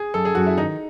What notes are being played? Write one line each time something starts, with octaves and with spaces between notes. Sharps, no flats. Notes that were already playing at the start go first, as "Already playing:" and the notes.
Already playing: G#4
F#2 A4
G#4
F#2 F#4
E4
D#3 D#4